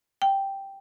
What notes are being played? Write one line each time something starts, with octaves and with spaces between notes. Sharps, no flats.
G5